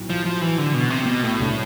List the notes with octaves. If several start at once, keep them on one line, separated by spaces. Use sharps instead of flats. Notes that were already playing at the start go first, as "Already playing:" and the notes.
Already playing: B1 A2
F3
F3
E3
D3
B2
C3
B2
A2
C2 B2 A3 D4